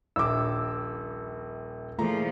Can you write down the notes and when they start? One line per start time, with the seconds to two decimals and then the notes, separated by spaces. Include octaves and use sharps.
0.16 D#1 A#1 D6 E6
1.99 A#2 E3 F3 A3 F4 G#4 A#5